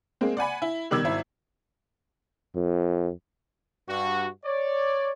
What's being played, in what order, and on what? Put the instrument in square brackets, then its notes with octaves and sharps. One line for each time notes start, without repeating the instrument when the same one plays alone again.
[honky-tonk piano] G#3 A#3 C4
D5 F#5 G#5 B5
E4
B2 D#3 G3 D6 E6 G#6
G#1 E4
[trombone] F2
[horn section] G2 F#4
C#5 D5